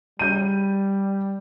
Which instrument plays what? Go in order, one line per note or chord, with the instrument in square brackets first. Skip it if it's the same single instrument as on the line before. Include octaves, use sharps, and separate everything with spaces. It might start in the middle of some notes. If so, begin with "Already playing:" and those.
[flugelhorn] G3 [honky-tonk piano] G6 D#7